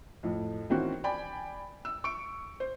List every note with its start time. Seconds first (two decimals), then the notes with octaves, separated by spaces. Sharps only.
0.23 F2 A2
0.70 D#3 E3 C4 C#4 F#4
1.04 D5 G5 G#5 B5
1.85 E6
2.04 C#6 D7
2.60 C5